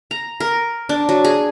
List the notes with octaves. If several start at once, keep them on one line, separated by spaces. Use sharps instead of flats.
A#5
A#4
D4
F#3
G#4